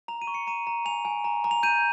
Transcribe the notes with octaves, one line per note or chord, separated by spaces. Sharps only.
A#5 F7
D#7
C#6
C#7
A#5 D#7
A#5
G#5 F7
G#5
A#5
A#5
F7
G6 D#7